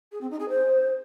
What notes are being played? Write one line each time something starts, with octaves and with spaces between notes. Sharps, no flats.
G#4
C4
D#4
G#4
C5